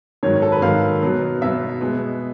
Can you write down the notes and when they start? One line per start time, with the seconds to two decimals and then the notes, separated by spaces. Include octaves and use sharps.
0.23 G#2 D#3 F#3 C#5
0.33 C#5
0.42 A4
0.52 B4
0.62 G#2 D#3 F#3 F5
1.02 B2 F#3 B3
1.41 B2 F#3 B3 E5
1.81 B2 G#3 B3